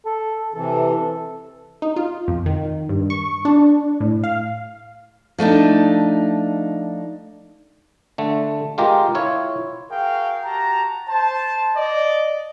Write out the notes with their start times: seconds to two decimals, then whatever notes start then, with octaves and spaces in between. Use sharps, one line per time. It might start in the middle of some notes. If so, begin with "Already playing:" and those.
0.06 A4
0.54 C3 E3 A4
1.82 D#4
1.96 F4
2.28 F2
2.46 D#3
2.89 G2
3.10 C#6
3.45 D4
4.00 A2
4.24 F5
5.38 F3 A3 D4 D#4
8.18 D3 A3
8.78 G#3 F4 G4 A#4
9.15 E4 F4 C#5
9.90 F#4 G#4 A#4 F5 G5
10.45 F#4 G4 A5 A#5
11.09 C5 A5
11.77 D5 D#5